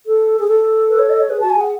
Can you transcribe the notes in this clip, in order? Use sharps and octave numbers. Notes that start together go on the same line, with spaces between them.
A4
G#4
A4
B4
C#5
D#5
C#5
G#4 B4
F#4 A5
G#5
G#4
F#5